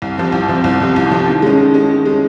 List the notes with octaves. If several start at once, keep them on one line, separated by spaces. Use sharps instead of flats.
C2
C3 F3
C2
C3 F3
C2
C3 F3
C2
C3 F3
D#3
G#3 C#4
D#3
G#3 C#4
D#3
G#3 C#4